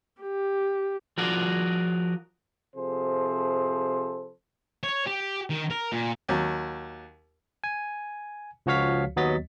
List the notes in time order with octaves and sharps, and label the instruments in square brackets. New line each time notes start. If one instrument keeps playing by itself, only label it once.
[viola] G4
[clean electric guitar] F3 F4 F#4 G#4 A#4 D5
[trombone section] C3 F3 G#4 A4 C5
[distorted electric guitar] C#5
G4
D#3
A#4
A#2
[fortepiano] D#2 F#3
[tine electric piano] G#5
C#2 F3 F#4 C#5 F5 B6
D#2 F#3 B3 D#5 A6 B6